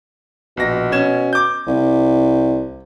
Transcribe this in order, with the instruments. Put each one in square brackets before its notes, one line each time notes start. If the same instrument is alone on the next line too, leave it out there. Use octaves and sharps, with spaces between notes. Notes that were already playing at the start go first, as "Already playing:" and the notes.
[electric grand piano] A#1 A#6 [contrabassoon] B2
[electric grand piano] C#4 G#6 E7
D6 G6
[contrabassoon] C2